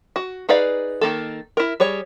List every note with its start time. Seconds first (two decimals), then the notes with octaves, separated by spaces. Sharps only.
0.16 F#4
0.49 D#4 G#4 B4 D5 F5
1.01 D#3 A#3 A4
1.57 E4 A#4
1.80 G3 G#4 C#5